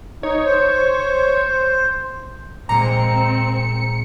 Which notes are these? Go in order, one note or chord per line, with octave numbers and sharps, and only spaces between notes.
D#4 C#5
C5
A#2 G#3 A#3 C4 A#5 C#7